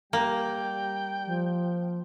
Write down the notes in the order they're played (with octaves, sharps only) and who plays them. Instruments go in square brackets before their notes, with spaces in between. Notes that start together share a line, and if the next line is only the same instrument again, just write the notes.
[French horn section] G3 [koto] A#3 [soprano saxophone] G5
[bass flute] F3